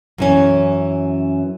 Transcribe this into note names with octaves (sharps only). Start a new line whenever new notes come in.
F#2 E3 C#4